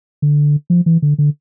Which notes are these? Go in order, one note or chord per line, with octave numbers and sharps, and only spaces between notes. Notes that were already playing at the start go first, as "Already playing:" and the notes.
D3
F3
E3
D3
D3